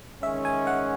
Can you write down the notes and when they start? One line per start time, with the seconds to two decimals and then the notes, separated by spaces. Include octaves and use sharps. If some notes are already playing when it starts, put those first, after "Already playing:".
0.23 D#3 G#3 C#4 E5
0.45 G#5
0.67 F#5